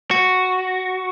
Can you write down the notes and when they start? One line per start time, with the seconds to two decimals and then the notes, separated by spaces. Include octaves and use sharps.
0.11 F#4